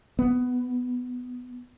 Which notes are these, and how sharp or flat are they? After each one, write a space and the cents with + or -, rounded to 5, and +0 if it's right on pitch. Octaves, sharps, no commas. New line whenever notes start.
B3 +10